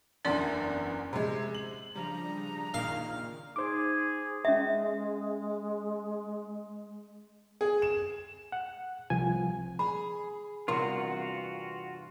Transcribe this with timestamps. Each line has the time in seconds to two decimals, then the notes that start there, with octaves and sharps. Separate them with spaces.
0.25 F#1 E2 D3 C#4 D5 C6
1.13 C3 G#3
1.55 F#7
1.96 C#3 F3 G3 D4 A#5
2.74 A#2 D#3 A#3 F5
3.56 D#4 G#4 C5 D6
4.45 G#3 C#4 E5
7.61 G#4
7.82 E7
8.52 F#5
9.10 C2 F3 G#5
9.79 G#4 B5
10.68 E2 G2 C3 F4 F#4 A#4 C6